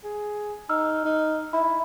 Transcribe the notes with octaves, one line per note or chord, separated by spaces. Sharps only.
G#4
D#4 A#5 E6 F6
D#4
E4 B5